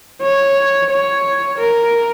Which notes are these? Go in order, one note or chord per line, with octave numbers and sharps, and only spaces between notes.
C#5
C#5
A#4